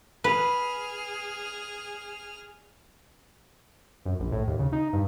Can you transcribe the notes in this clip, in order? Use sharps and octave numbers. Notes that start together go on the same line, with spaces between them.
G#4 B4 F6
F#2
A#1
A2
D#2
C#3
D#4
G2